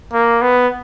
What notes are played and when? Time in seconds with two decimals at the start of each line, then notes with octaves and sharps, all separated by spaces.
0.13 A#3
0.41 B3